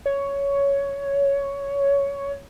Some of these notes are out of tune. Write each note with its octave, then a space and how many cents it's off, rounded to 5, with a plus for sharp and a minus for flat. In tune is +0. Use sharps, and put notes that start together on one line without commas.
C#5 +10